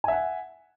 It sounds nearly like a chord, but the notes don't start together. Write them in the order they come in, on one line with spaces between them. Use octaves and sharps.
G#5 E5 F#5